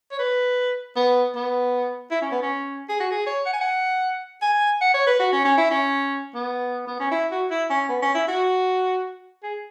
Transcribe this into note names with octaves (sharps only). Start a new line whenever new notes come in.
C#5
B4
B3
B3
E4
C#4
B3
C#4
G#4
F#4
G#4
C#5
F#5
G#5
F#5
G#5
F#5
C#5
B4
F#4
C#4
C#4
E4
C#4
B3
B3
C#4
E4
F#4
E4
C#4
B3
C#4
E4
F#4
G#4